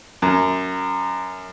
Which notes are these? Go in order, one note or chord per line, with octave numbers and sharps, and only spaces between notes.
F#2